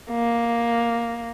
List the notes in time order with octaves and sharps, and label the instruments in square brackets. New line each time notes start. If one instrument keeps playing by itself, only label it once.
[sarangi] A#3